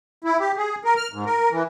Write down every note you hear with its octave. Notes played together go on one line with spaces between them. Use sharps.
E4
G4
G#4
A#4
F6
G#2
A#4
E3